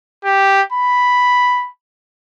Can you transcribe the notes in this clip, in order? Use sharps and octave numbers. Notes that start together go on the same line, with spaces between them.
G4
B5